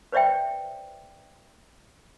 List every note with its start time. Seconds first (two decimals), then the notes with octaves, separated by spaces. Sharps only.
0.12 B4 C5 D5 E5 G5